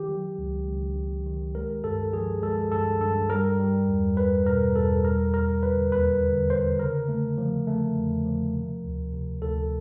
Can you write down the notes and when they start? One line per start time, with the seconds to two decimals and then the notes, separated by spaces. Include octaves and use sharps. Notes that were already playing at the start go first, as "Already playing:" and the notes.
Already playing: D#3 G4
0.09 F#3
0.38 C#2
0.67 C#2
0.96 C#2
1.26 D#3
1.55 G#3 A#4
1.84 G2 A4
2.13 F3 G#4
2.42 G#3 A4
2.72 G2 A4
3.00 G2 A4
3.30 G3 A#4
3.59 G3
3.88 E2
4.17 E2 B4
4.46 B2 A#4
4.76 E2 A4
5.05 G3 A#4
5.34 D#2 A#4
5.62 D3 B4
5.92 D#2 B4
6.22 D3
6.50 D3 C5
6.80 C#3 A#4
7.08 A3
7.38 F3
7.67 A3
7.96 E2
8.25 F3
8.54 C3
8.84 D2
9.12 C3
9.42 D2 A4